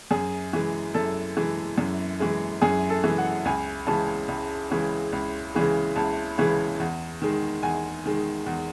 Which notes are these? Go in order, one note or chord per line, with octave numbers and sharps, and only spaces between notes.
F#2 G#4
E3 G#3
F#2 A4
E3 G#3
F#2
E3 G#3
F#2 G#4
A4
E3 G#3
F#5
C#2 G#5
C#3 E3 G#3 A5
C#2
C#3 E3 G#3
C#2
C#3 E3 G#3
C#2 A5
C#3 E3 G#3
E2
D#3 G#3
E2 G#5
D#3 G#3
E2